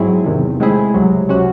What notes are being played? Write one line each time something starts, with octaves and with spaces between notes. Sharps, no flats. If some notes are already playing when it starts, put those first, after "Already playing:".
Already playing: G#2 F#3 C4 E4 G#4
E2 C3 D#3
A2 G#3 C4 E4 G#4
C#2 C3 F#3
C3 F#3 C#4 F#4